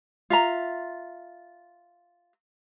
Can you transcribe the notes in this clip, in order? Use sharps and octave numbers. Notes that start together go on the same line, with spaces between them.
F4 E5 A#5